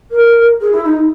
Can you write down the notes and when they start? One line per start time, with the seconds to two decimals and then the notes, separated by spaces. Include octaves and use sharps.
0.11 A#4
0.60 G#4
0.72 E4
0.84 D#4